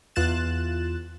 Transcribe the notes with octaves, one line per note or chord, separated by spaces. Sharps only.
E2 F4 F#6 A6 E7